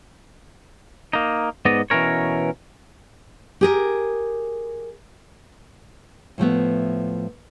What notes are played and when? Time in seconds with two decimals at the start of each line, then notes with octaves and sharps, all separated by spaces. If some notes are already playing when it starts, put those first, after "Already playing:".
1.13 A#3 D#4
1.65 G#2 B3 D5 D#5
1.90 B2 E3 A3 C#4 A#4 C#5
3.61 G4 G#4 A#4
6.38 A2 F3 A3 B3